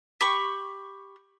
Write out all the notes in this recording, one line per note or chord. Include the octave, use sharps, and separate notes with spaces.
G4 B5 C#6